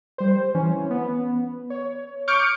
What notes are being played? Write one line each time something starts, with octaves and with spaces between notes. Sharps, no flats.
G3 C5
E3 C#4
B3
C#5
C#6 D6 F6 G6 C#7 D7